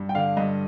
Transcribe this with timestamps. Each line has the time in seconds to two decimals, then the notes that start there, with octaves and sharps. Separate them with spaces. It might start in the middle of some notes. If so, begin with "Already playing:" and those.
Already playing: G2
0.09 G5
0.15 D3 F5
0.37 G2 D#5